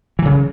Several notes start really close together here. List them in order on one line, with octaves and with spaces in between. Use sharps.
E3 F#3 C#3